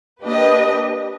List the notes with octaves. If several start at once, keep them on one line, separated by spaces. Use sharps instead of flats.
A#3 D4 G4 B4 D#5